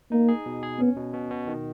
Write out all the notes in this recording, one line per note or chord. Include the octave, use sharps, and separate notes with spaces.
A#3 D#4
G#4
B2
G#4
B3 C#4
B2
B2
B2
D#3